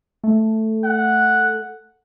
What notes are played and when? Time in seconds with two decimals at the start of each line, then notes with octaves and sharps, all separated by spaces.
0.24 A3
0.84 F#5